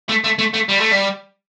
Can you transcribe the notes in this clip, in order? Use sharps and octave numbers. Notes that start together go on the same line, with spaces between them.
A3
A3
A3
A3
G3
A3
G3